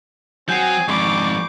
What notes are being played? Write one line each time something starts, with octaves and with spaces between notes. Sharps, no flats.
F#3 C4 G#4 G#5 G6 C7
F2 G#2 D5 B5 C#6 D6